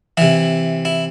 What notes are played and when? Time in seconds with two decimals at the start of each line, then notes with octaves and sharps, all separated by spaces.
0.17 C3 E3 E4
0.85 E4